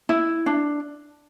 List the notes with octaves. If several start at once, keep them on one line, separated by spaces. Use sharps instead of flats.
E4
D4